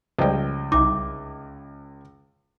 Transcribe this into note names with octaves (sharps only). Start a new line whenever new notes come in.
C#2 F3 G3 D#5 G5
C2 D#4 E5 D6